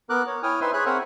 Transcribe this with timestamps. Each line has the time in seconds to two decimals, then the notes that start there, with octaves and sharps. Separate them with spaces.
0.10 B3 A#4 D6 F#6
0.27 C#5
0.43 E4 C#5 G5 G#5 D#6 F6
0.61 D#4 B4 C5 E5 C6
0.73 G#4 C#5 G#5 B5 F#6
0.86 C4 A#4 C5 C#5 E5 F#5